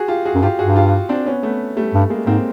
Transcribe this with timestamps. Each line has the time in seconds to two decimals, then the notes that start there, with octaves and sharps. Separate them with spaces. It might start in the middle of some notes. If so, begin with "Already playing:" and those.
Already playing: F#4 G#4
0.08 F4 G4
0.26 F#4 G#4
0.35 F#2
0.42 G2 F4 G4
0.59 G2 F#4 G#4
0.76 F4 G4
1.09 C4 D4
1.26 B3 C#4
1.43 A3 B3
1.76 G3 A3
1.94 G2
2.10 G#3 A#3
2.26 G#2 A#3 C4